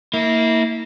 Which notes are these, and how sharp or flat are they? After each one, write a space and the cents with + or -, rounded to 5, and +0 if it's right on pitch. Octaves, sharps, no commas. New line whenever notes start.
A#3 -20 E4 -30